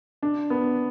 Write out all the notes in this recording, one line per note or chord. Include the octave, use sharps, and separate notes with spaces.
D4
B3